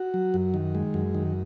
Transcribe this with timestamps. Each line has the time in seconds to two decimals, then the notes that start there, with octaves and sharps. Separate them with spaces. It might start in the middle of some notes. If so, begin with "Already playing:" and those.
Already playing: F#4
0.14 F#3
0.34 F#2
0.54 D#3
0.75 G#3
0.94 F#2
1.15 D#3